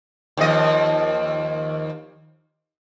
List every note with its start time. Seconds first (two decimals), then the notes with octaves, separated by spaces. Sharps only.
0.37 D#2 F3 D#5